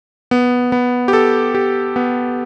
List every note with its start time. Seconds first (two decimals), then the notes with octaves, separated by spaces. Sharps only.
0.31 B3
0.72 B3
1.08 G4
1.13 A4
1.55 G4
1.96 B3